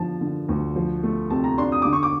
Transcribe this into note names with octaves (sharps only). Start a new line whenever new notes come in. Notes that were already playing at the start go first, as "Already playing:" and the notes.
Already playing: D3 F3 A5
D3
D2
F3
A3
C3 A5
A#5
D4 C6
D#6
D3 D6
C#6
D6